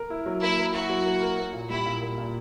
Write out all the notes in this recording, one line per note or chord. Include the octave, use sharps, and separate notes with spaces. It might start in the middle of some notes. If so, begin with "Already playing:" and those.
Already playing: A#4
E4
F#3
A#3 E4
A#4
E4 F#4
F#3
A#3
A#4
A#3
A#2
G3 E4
A#2
A#3
A#2